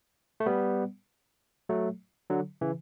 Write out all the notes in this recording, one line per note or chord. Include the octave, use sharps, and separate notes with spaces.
A3
G3 B3
F#3 A3
D3 F#3
C#3 E3